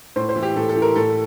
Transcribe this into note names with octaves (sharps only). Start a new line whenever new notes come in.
A2 C5
C5
E3
G4
A2 A4
A4
E3
A#4
A2 A4